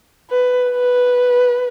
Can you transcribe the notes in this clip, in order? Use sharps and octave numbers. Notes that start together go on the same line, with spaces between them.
B4
B4